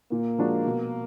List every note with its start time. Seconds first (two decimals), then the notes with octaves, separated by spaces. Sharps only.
0.11 A#2 A#3
0.38 F3 G#3 D4 F#4
0.66 B2